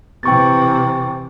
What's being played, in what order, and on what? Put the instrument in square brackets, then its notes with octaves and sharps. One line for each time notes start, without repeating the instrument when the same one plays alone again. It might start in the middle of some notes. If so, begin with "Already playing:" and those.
[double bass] C3 E3 [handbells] G5 C#6 A6